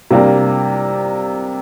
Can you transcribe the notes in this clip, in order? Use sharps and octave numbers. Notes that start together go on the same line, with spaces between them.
C3 G3 A#3 D4 G4